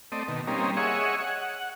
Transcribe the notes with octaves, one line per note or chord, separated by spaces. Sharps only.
A3 C4 D5 D#5
B2 D#3
G3 A#3 C4 C#4 D#4
G#4 C#5 D#5 E5 F#5 C#6
F#5